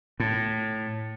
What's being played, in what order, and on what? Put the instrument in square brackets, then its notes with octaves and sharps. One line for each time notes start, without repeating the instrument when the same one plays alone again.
[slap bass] A2